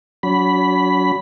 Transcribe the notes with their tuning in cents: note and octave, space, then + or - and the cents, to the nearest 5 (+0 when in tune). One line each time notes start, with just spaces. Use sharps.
F#3 +0 C#4 +45 B5 +0